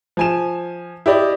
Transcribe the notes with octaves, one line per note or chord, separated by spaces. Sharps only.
F3 G#5 E7
E4 G4 D5 D#5